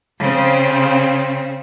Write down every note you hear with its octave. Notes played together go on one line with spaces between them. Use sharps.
C#3 C4